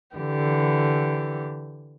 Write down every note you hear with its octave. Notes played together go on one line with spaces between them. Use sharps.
D3 E3 G4